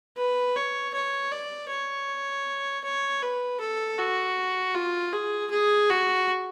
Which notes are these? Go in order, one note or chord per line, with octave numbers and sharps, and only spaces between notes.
B4
C#5
C#5
D5
C#5
C#5
B4
A4
F#4
F4
G#4
G#4
F#4